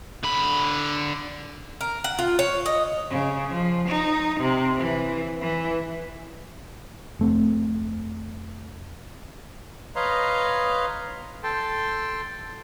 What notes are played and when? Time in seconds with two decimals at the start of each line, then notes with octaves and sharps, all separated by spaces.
0.23 D3 B5
1.81 A#4
2.04 F#5
2.19 F4
2.39 C#5
2.66 D#5
3.10 C#3
3.52 F3
3.88 D#4
4.40 C3
4.78 E3
5.42 E3
7.19 F1 A3 C4
9.96 B4 C#5 D#5 F5 A#5 C6
11.43 A4 G5 A5 C6